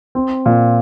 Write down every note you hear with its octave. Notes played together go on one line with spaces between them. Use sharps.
C4
A#2